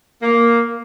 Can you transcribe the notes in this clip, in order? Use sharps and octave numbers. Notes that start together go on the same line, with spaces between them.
A#3